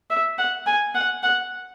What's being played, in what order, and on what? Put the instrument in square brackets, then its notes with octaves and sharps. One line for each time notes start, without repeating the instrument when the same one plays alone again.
[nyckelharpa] E5
F#5
G#5
F#5
F#5